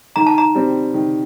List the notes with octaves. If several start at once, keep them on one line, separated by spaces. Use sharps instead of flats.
D#3 A#5
A5
A#5
G3 C4
D#3